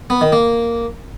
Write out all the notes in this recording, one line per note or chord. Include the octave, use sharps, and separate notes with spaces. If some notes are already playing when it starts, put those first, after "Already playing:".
B3
D#3
A#3